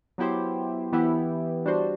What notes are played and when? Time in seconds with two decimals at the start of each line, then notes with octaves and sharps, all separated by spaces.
0.18 F#3 B3 E4 G4 C5
0.92 E3 B3 E4 G4
1.66 G3 D4 F#4 C5